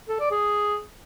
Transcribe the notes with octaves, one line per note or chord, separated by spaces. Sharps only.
A4
D5
G#4